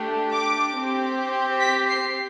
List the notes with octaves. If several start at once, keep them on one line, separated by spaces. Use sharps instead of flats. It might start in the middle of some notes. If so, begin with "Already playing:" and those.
Already playing: A3 D4 G4
D6
C4 G4
B6
C7